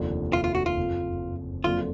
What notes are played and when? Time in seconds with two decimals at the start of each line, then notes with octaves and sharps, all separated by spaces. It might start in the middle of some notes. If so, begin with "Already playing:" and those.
Already playing: F1 D#2 D3 F3
0.33 F4
0.44 F4
0.55 F#4
0.66 F4
0.77 F#1 F2 F3
1.64 F#1 F2 D3 F#3 A#3 F4